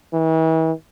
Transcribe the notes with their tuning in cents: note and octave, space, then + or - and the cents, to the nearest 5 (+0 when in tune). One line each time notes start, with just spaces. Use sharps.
E3 -40